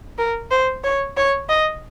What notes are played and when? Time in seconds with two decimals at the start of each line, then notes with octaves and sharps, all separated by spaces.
0.18 A#4
0.51 C5
0.84 C#5
1.17 C#5
1.49 D#5